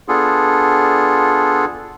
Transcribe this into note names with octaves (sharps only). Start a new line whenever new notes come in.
B3 D4 F4 G#4 A4